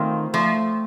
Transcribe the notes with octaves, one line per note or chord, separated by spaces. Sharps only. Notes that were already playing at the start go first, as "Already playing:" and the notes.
Already playing: D#3 A3 C4 F4 C5
F3 A3